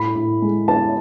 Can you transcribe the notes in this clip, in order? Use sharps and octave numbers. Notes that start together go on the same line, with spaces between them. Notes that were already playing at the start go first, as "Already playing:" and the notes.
Already playing: A2 B5
A2
G#3
B3 A5